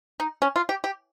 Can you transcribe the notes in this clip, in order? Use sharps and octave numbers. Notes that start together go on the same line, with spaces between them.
D#4
C#4
F4
G4
G4